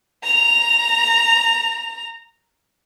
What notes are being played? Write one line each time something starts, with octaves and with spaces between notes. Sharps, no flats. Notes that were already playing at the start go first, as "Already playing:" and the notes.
A#5 F7